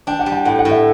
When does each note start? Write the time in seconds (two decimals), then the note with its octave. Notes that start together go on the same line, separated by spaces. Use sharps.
0.07 D4 G5
0.19 F#5
0.26 G3
0.32 G5
0.45 A2 F#5
0.59 F#5
0.65 A2
0.71 E5